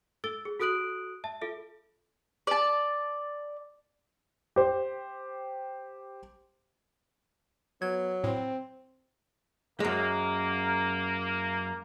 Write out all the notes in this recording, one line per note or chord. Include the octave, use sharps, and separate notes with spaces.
A4 E6 A6 G7
G#4
F#4 A4 D#6 F#6 D7 F#7
E5 A5
F4 A4 E5
D5 A5
G4 C5
F#3 B3 G#6
A2 C4
F#2 G#3 A#3